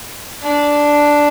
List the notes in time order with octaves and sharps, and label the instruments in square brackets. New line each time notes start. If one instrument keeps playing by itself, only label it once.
[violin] D4